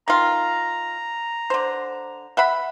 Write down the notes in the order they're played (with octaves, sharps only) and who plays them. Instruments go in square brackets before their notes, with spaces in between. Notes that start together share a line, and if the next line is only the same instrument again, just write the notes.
[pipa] D#3 F4 [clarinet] A#5
[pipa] D3 C5
E5 F#5 B5